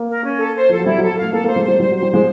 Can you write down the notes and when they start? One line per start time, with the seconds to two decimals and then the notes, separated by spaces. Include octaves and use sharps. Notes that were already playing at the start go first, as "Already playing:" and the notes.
Already playing: A#3
0.09 A#4
0.25 C#4
0.39 A4
0.55 C5
0.69 F3 A4
0.78 F#3
0.86 G3 E4
0.98 F#3
1.02 A4
1.10 F#3
1.17 A3 F5
1.32 A#3 A4
1.44 A#3 C5
1.56 G#3
1.63 G3 C5
1.79 G3 C5
1.91 F#3 C5
2.02 G3
2.10 G#3 C5